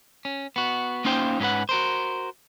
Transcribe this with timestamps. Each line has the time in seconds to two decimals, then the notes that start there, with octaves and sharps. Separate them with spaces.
0.25 C#4
0.56 B3 F#4
1.05 A#3 C#4 D#4 F4 C5 G5
1.40 G#2 C#4 G4 B4 F#5
1.69 F#4 A#4 C5